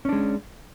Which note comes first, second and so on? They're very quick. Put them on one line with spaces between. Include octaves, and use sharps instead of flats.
C#4 D4 G#3